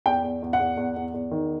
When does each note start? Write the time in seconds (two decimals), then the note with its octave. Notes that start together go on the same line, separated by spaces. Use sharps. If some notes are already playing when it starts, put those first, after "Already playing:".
0.06 E2 G5
0.24 E2
0.42 E2
0.53 F#5
0.60 E2
0.77 E2
0.96 E2
1.14 E2
1.31 D#3